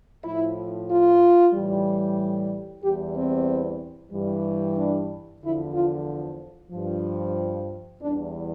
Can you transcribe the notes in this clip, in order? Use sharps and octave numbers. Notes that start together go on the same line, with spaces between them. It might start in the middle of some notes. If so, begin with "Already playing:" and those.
A2 F3 E4
F4
A2 E3 G3
E2 E3 G3 G4
C4
G2 E3 G3
D4
E2 D3 F3 E4
F4
G2 F3
E2 E3 G3 D4